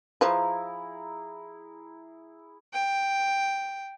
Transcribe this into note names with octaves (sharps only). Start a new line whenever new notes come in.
F3 E4 G#4 B4 A#5
G5